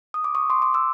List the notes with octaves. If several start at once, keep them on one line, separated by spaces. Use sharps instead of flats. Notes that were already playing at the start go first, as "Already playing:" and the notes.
D#6
D6
C#6 D#6
C6 D6
C6 D6
D6 E6